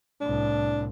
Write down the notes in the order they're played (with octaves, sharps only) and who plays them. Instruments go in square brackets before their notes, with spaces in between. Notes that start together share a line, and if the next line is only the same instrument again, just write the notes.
[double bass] C2 A2 [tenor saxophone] D4